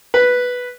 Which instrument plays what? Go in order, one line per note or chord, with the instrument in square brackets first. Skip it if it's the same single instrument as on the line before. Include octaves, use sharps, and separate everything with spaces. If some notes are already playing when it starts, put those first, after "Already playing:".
[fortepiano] B4